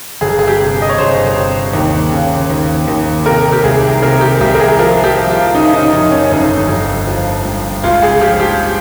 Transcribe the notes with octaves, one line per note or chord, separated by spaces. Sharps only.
G1 G#4
G#4
G4
C3
D#5
C#5
G1 C5
C3
D#2
C#3
D#2
D#2
C3 A#4
G4
C2 G#4
C3 A#4
G4
C2 G4
A#4
G#4
F3 A#4
G4
F3
F4
C#3 D#4
C#4
D#4
F2 D#4
C#4
C#4
G1 D#4
G1
F3
G2
C#2 F4
G#4
F3 G4
G4